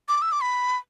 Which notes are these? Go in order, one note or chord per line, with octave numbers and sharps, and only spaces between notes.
D6
E6
D6
B5